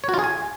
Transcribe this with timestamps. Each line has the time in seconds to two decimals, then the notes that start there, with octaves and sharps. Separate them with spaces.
0.04 C#5
0.09 F#4
0.14 F4
0.19 G#4
0.24 G#5